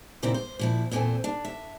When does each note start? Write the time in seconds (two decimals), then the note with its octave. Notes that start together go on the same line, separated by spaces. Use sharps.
0.23 A#2 C#3 C4 E4 D5 A#5
0.34 C5
0.59 A#2 F3 E4
0.91 E2 A#2 G#3 C4 A4 G#5
1.24 D4
1.45 E5